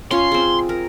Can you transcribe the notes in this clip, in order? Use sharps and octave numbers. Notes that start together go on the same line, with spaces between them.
C#4 F4 C#5 C6
C4 G#4
A#4